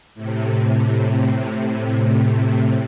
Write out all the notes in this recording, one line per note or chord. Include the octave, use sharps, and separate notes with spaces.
A2 C3